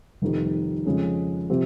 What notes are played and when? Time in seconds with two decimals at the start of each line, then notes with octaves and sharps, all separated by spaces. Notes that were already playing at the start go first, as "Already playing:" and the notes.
0.22 F1 F2 D#3 G3
0.86 F2 C#3 F3 G#3 C#4
1.50 C3 F3 C4 G4